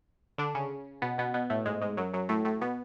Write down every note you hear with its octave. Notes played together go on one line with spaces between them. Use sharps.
D3 D4
C#3 C#4
B2 B3
B2 B3
B2 B3
A2 A3
G#2 G#3
G#2 G#3
F#2 F#3
F#2 F#3
A2 A3
A2 A3
B2 B3